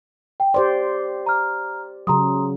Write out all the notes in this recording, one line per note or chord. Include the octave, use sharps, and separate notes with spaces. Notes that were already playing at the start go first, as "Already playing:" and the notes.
G5
G4 C5 D5 C6
A#5 F6
C#3 F#3 A#5 C6 D#6